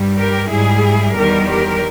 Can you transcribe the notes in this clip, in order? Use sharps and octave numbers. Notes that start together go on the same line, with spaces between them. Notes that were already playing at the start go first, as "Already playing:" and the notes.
Already playing: G2 G3
G4 A#4
G#2 G3 E4 G#4
E2 D#3 G3 G4 A#4
G4 A#4